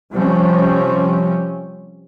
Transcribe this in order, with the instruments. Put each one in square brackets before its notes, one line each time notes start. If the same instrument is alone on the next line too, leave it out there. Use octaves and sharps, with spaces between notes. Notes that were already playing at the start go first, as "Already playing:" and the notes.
[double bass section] C3 F3 G3 C4 C#4